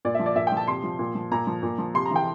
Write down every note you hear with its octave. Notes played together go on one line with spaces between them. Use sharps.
A#2 D5
E5
F3
D5
A#2 E5
G5
F3 A5
C3 C6
F3
A#2
F3
A#2 A#5
F3
A#2
F3
C3 C6
A#5
E3 G5